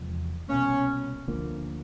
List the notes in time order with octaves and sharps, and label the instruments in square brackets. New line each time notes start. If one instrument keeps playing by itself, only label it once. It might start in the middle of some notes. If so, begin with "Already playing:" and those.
Already playing: [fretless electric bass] E2 C3 F3 G#3
[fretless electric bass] C2 B2 F#3 A#3 [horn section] C#4
[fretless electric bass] D2 D3 F3 A#3